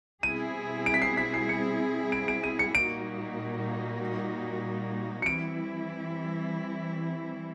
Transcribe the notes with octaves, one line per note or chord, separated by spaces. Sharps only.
B2 G3 C4 E4 G#4 D#7
D7
B6
C7
B6
C7
C#7
D7
D7
D#7
C#7
A#2 G3 A#3 D#4 F#4 D7
C#7
E3 G3 C4 E4 D7